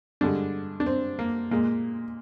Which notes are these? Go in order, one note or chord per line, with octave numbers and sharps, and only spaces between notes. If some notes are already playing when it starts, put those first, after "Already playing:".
G2 D3 G#3 D4
D4
C4
A#3
A#2 G#3 A#3